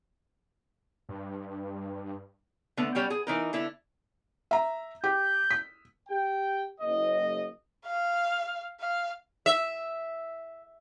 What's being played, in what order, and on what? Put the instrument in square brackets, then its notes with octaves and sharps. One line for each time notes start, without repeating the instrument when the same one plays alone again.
[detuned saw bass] G2
[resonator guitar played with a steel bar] D3 A3 B3
G3 C#4 G5
G#4
E3 D#4 A#4
D3 D4 E4
[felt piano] E5 A#5
[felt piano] G4 [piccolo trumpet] G6
[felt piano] B6
[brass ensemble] G4 G5
F#1 D#5
[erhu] F5
F5
[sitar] E5